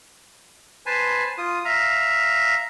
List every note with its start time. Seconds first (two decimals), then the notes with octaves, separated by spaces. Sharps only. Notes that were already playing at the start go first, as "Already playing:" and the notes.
0.86 B4 C5 G#5 A5
1.38 F4 D#6
1.65 E5 F5 A#5